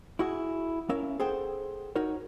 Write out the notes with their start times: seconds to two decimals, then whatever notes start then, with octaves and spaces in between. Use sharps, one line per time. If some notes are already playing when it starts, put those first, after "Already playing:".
0.19 E4 F#4 G#4
0.89 C#4 A#4 E5 F5
1.20 G#4 A4 C5 F#5 G5
1.96 D#4 F#4 A#4 C#5